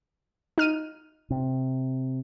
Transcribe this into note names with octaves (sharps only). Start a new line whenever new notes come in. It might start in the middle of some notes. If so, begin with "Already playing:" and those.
D#4 F6 D#7
C3